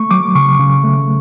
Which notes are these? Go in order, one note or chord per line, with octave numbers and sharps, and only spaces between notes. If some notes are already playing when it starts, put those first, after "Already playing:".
Already playing: A3 C#6
F#3 D6
C#3 C#6
C#3
A3